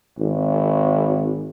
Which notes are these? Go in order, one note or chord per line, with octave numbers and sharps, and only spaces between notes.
G#1